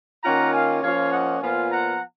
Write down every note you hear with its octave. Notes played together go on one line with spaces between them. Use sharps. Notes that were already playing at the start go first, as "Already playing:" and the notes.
D#3 A#3 C#4 F4 F#5 A#5
F5 G#5
F3 A#3 C#4 F4 C#5 F5
D#5 F#5
A#2 F3 B3 F4 F5 G#5
F#5 A#5